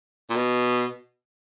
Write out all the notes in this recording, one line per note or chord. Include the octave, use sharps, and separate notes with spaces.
A#2
B2